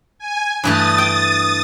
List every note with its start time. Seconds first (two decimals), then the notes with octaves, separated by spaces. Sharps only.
0.19 G#5
0.64 G2 E3 A3 D#6 A6
0.98 G5